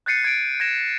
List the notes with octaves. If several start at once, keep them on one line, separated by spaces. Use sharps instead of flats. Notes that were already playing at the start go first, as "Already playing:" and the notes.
F#6 G6 A6 C7 C#7 D#7
G#6 D7
G#6 A#6 E7